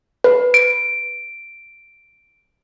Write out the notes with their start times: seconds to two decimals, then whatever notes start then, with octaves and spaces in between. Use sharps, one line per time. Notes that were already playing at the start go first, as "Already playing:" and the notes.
0.24 B4
0.54 D7